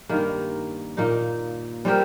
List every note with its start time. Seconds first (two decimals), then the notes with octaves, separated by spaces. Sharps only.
0.09 G2 D#3 A#3
0.97 A#2 A#3 D#4
1.85 G3 C4 G4 A#4